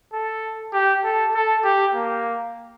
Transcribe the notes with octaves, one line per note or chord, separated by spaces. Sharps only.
A4
G4
A4
A4
G4
A#3